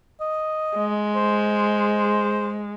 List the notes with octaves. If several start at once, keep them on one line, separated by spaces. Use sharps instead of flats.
D#5
G#3
C5